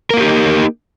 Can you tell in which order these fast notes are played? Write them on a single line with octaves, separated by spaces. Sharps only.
A#4 A#3 F4 G4 D#4